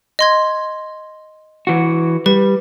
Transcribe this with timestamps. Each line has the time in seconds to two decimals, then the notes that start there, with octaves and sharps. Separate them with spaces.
0.19 D#5 C6 G#6
1.67 E3 F#4
2.26 G3 B4